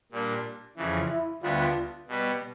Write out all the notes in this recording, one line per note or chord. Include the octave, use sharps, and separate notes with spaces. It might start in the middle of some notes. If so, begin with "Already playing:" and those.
A#2 G3 A#3 D4
F2 C#3 E3
E4
D2 D3 G3 B3 D4 F4
B2 G3 B3